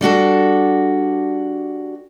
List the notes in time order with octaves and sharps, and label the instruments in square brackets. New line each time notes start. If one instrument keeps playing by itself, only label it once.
[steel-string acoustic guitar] G3 D4 F#4 A4